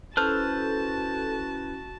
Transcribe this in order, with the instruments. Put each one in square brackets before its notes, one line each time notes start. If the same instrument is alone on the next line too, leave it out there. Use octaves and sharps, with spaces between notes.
[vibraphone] C#4 E4 [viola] F#4 A5 [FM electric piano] A4 [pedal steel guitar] B4 C5 F6